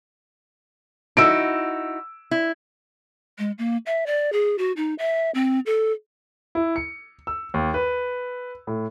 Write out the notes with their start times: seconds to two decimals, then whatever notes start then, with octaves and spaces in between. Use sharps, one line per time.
1.17 D#4 E4 F#4 E6 D7
2.31 E4
3.39 G#3
3.58 A#3
3.86 E5
4.07 D5
4.32 G#4
4.58 F#4
4.77 D#4
4.99 E5
5.35 C4
5.66 A4
6.55 E4
6.76 C#7
7.27 E6
7.54 D#2
7.74 B4
8.67 A2